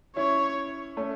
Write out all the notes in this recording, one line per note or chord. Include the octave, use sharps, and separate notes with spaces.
C#4 E4 C#5
A3 C#4